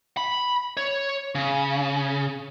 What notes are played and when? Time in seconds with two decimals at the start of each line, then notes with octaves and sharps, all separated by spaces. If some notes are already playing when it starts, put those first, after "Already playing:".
0.17 B5
0.77 C#5
1.35 C#3